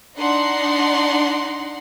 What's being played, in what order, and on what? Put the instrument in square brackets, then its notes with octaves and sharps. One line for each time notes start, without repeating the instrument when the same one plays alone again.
[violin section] D4 D#4 F#5 C6